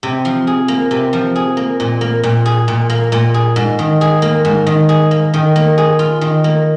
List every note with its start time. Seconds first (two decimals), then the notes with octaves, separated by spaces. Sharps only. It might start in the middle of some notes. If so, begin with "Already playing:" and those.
0.03 C3
0.25 F3
0.47 G#4
0.68 A#3
0.91 C3
1.13 F3
1.36 G#4
1.57 A#3
1.80 A#2
2.01 A#3
2.23 A#2
2.46 G#4
2.68 A#2
2.90 A#3
3.12 A#2
3.34 G#4
3.56 G#2
3.79 D#3
4.01 G#4
4.22 A#3
4.45 G#2
4.67 D#3
4.89 G#4
5.11 A#3
5.34 D#3
5.56 A#3
5.78 G#4
5.99 F4
6.21 D#3
6.44 A#3